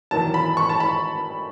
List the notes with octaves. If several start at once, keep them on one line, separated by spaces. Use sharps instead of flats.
E2 D#3 F#3 A5
B5
C#6
A5
B5